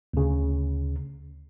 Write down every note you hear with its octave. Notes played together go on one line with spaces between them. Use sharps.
D2 C#3